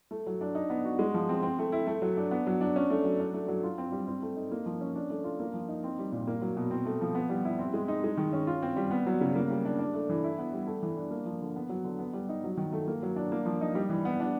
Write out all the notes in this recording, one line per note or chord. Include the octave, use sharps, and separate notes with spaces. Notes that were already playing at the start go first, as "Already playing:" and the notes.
A3
F#3
D4
D#4
B3
F#4
G#3
F3
C4
C4
A3
E4
A3
F#3
D4
B3
F#3
D4
C#4
A3
F#3
D4
A3
F#3
F4
C4
G3
C4
A3
D#4
A#3
F3
C#4
D4
A3
F4
A#3
F3
D#4
C4
G3
A#2
A#3
F#3
B2
C4
A3
F3
B3
G3
E4
C4
G#3
D#4
G#3
D#3
C#4
F4
C4
G3
B3
F#3
C#3
A#3
G3
D4
D4
A3
E3
E4
B3
G3
A3
E3
D4
A#3
F3
D3
B3
F#3
D3
B3
G3
D#4
F#3
D#3
A3
A#3
F#3
D4
A#3
F3
D#4
G3
E3
B3
D4